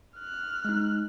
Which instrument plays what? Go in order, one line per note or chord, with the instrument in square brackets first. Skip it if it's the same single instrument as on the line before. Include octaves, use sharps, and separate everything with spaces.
[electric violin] F6 F#6
[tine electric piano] G#3 D#4